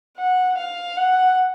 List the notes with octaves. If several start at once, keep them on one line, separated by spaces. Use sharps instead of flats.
F#5
F5
F#5